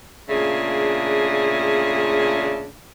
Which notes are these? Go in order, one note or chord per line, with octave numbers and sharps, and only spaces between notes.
A#2 C#3 A3 D4 G#4